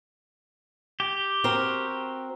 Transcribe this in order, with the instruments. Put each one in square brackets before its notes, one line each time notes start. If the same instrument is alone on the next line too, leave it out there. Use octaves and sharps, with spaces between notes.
[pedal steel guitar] G4
[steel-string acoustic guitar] C4 F#4 A#4